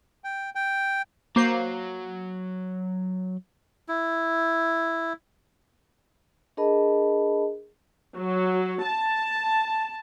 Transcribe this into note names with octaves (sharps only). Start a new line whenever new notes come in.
G5
G5
F#3 A#3 C5 C7
E4
D4 G#4 A#4 D#5 A5 B5
F#3
A5